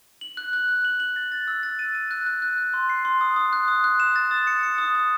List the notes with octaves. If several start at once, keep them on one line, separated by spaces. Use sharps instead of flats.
F#7
F#6
F#6
F#6
F#7
F#7
A6
A6
E6
A6
D#7
D#7
F#6
F#6
F#6
F#6
C6
C7
C6
D#6
D#6
F#6
D#6
F#6
E7
A6
D#6
C#7
C#7
D#6
D#6